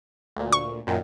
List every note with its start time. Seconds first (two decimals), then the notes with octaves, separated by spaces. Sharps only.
0.36 D2 A#2
0.53 C#6
0.87 F#2 A#2 D#3